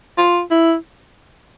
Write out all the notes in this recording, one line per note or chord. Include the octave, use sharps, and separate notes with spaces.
F4
E4